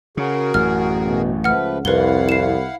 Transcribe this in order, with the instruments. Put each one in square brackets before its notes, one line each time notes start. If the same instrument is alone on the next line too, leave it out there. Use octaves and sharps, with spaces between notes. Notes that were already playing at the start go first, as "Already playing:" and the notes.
[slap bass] C#3 [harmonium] F#4 G#4 A#4
[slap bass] A1 F#2 [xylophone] F6
[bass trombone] B2
[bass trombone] C#2 [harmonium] F3 A3 B4 [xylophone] F#5 F6
[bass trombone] C2 [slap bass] F2 [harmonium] E4 F5 F#5 [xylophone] B4 G7
[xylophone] C7 E7